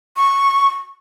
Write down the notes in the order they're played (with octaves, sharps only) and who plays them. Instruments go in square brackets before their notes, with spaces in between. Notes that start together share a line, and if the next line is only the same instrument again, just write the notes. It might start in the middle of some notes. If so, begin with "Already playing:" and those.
[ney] C#6